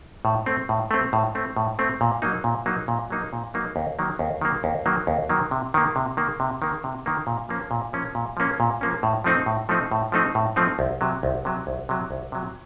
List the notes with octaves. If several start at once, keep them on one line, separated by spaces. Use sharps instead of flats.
A2
A3 C4
A2
A3 C4
A2
A3 C4
A2
A3 C4
A#2
F#3 A#3 D#4
A#2
F#3 A#3 D#4
A#2
F#3 A#3 D#4
A#2
F#3 A#3 D#4
D#2
D#3 F#3 A#3
D#2
D#3 F#3 A#3
D#2
D#3 F#3 A#3
D#2
D#3 F#3 A#3
C3
D#3 A#3
C3
D#3 A#3
C3
D#3 A#3
C3
D#3 A#3
A#2
F3 A#3 C#4
A#2
F3 A#3 C#4
A#2
F3 A#3 C#4
A#2
F3 A#3 C#4
A2
F3 A3 C4 D#4
A2
F3 A3 C4 D#4
A2
F3 A3 C4 D#4
A2
F3 A3 C4 D#4
C2
C3 F#3
C2
C3 F#3
C2
C3 F#3
C2
C3 F#3